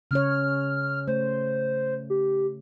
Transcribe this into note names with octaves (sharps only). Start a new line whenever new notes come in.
C#3 C#4 C#5 F6
A3 C5
G4